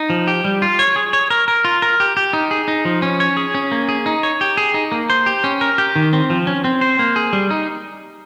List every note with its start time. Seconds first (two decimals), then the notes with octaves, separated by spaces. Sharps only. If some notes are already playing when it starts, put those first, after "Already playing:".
Already playing: D#4
0.10 F3
0.27 G4
0.44 G3
0.62 F4
0.79 C#5
0.96 G#4
1.13 C#5
1.30 A#4
1.48 A#4
1.65 F4
1.82 A#4
2.00 G4
2.17 G4
2.33 D#4
2.51 G#4
2.68 D#4
2.85 F3
3.02 C#4
3.20 C#5
3.37 G#4
3.55 C#4
3.72 A#3
3.89 G#4
4.06 D#4
4.23 C#5
4.41 G4
4.57 G#4
4.74 D#4
4.92 A#3
5.10 C5
5.26 G4
5.44 C#4
5.61 A#4
5.78 G4
5.96 D#3
6.13 C4
6.30 F3
6.47 C#4
6.64 C4
6.81 C5
6.99 A#3
7.16 G#4
7.33 G3
7.51 D#4